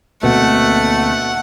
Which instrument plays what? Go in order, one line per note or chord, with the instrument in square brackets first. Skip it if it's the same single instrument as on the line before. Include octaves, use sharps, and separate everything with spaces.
[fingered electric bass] D2 A#3 C4 [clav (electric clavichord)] B2 [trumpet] A3 [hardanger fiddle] F#5